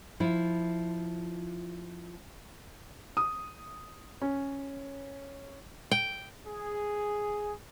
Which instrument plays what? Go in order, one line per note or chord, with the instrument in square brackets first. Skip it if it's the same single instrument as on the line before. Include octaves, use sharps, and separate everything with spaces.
[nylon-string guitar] F3 E4 F4
[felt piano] D#6
C#4
[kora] G5
[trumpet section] G#4